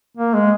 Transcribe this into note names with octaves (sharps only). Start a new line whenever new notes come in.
A#3
G#3